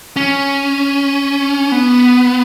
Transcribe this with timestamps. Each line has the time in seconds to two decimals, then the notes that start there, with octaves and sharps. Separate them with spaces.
0.16 C#4
1.72 B3